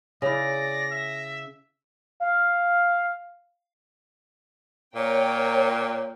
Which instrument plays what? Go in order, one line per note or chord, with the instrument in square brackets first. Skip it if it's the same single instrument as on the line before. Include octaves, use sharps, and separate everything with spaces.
[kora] C#3 E4 [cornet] D5 [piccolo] A#6
[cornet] E5
[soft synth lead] F5
[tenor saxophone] A#2 [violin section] A#4 C#5 G5